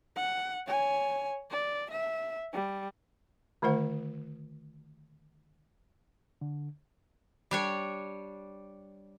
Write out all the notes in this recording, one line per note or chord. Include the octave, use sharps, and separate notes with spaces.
F#5
C#5 G#5
D5
E5
G3
D3 D#3 A3 F4 C5 F#5
D3
G3 D4 C#5